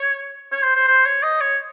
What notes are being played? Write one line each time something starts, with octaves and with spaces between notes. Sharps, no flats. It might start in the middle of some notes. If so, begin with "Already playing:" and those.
Already playing: C#5
C#5
C5
C5
C5
C#5
D#5
C#5